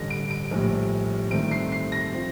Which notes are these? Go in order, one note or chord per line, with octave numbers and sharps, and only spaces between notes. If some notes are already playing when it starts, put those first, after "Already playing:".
Already playing: A1 G2 D3 A#6
D7
D7
A#1 A2 G3
G2 D#3 A3 C4 D7
C7
C7
A#6
F3 C4